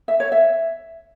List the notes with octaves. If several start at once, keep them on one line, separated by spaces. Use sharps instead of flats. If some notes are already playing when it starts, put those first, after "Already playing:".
E5
C#5
E5